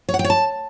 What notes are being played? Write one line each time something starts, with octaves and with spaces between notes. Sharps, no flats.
C#5
F#5
G5
C#5
A5